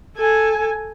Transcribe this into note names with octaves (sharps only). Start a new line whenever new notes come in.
A4 G#5